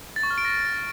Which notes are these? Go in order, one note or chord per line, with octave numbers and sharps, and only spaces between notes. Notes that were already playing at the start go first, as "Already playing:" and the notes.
A6
C#6
F6
D7
A#6